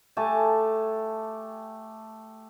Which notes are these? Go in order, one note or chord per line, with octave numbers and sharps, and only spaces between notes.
A3 G4 G#5 A5